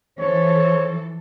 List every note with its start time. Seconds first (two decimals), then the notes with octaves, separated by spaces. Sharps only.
0.19 E3 F3 A4 C5 C#5